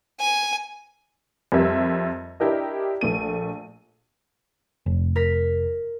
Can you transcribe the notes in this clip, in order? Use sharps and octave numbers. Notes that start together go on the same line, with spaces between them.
G#5
F2 G3 A#4 E5 G#6
D4 E4 G4 A#4 D#5
A#1 A3 D#7
F1
A#4 B6